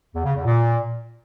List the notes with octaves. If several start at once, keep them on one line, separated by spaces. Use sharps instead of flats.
E2
C#3
E2
A#2